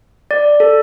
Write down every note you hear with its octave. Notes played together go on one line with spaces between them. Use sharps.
D5
A4